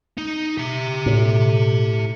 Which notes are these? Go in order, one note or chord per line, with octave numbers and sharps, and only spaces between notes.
D#4
G4 E5
A2